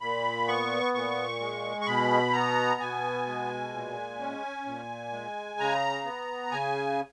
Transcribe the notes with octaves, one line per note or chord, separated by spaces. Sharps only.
A#2 B5
B3 C#6
A#2 C#6
G#3
C#6
B2 B5
B3 A#5
B2 G#5
G#3
A#2
C#4
A#2
G#3
C#3 A#5
B3
C#3 G#5